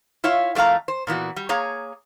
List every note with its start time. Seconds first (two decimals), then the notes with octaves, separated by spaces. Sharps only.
0.24 E4 F4 C#5 E5 F5
0.55 F2 A3 B3 F5 A#5
0.88 C5
1.07 A#2 E3 B3 F#4
1.36 G3
1.49 A#3 G#4 C#5 A#5